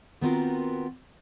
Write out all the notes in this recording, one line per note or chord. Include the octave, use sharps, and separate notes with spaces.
D#3 B3 C4 F4 F#4 A#4